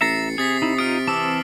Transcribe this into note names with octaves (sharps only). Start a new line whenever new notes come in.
A1 E5 A#5 A6 C7 C#7
C3 G#4 D#6 A6 B6
D#4 E4
D#4 F4 D#6 F6 D7
E3 C4 A5 D6 E6